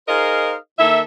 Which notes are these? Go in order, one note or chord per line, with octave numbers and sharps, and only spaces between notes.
D#4 G#4 A#4 C5 D#5 F5
D#3 A#3 A4 E5